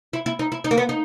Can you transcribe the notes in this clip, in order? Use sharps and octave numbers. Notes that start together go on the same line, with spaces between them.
E4
E4
D#4
E4
D#4
A#3
B3
D#4